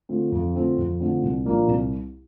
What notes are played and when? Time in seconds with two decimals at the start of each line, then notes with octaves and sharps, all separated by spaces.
0.09 D3 A3 C4 F4
0.32 F2
0.54 D3 A3 C4 F4
0.78 F2
1.00 D3 A3 C4 F4
1.23 C2
1.45 A#2 F3 A#3 D4
1.68 C2